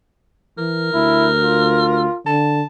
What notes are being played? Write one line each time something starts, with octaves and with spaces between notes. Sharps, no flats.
E3 A#4
D2 E4
F4
D3 A5